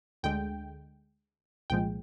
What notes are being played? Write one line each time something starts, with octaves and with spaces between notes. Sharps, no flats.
D2 D3 G#3 G5
C2 A#2 F3 G#3 G5